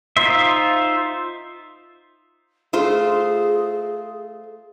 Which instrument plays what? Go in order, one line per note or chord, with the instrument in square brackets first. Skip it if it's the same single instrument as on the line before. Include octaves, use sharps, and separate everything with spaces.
[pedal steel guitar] D#4 F4 C5 E5
[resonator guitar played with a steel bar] A3 F4 C5 [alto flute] G#4